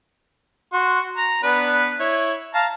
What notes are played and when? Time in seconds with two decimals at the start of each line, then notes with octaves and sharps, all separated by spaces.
0.73 F#4 C6
1.18 A#5
1.43 B3 D4 B4
2.00 E4 C#5
2.54 F5 A5 A#5